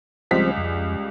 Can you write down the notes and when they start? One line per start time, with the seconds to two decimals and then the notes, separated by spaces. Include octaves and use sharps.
0.31 C#2 F3 G3 C4 C5 B6
0.57 F2